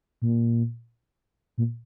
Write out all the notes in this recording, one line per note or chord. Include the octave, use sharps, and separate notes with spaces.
A#2
A#2